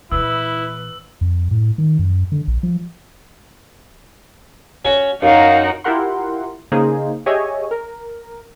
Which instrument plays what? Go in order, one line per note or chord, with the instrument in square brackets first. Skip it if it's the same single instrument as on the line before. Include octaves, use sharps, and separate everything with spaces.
[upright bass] A#2 E3 [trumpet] E4 [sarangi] B4 [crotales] E6
[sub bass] F2
A2
D#3
F#2
D3
A#1
F3
[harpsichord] C#4 F#4 C#5
[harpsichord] F#2 [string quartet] D#4 F#4 A#4 [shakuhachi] F5
[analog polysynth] E4 F4 G4 A#4 F#5 C6
C#3 A#3 D#4 G#4 C5
G4 G#4 C#5 D#5 E5 G#5
A#4